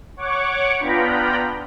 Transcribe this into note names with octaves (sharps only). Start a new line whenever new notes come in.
C#5 F#5 C#6 D6
B3 D4 F4 G5 A#5 B5